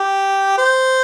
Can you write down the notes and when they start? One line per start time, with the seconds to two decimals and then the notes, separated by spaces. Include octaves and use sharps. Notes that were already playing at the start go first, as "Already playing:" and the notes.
Already playing: G4
0.58 C5